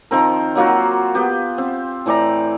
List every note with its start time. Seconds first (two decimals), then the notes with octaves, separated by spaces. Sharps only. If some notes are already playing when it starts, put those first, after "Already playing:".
0.11 D#3 F3 C4 A#4
0.55 F#3 A#3 F4 F#4
1.15 B3 G4
1.58 C4
2.06 A2 E3 D5 A#5